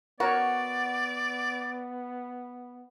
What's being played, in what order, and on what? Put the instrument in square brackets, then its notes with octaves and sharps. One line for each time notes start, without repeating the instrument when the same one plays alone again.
[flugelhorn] B3 [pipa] F#4 [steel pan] A#4 C#5 [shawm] D5